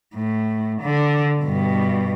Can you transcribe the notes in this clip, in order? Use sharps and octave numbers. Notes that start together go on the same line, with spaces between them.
A2
D3
G2 B2